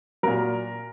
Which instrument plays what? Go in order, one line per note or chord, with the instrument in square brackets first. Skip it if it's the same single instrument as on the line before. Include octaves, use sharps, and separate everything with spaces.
[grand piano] A#2 F#3 A#4 A#5